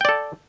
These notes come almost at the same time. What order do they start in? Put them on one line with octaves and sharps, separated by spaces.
G5 D5 A4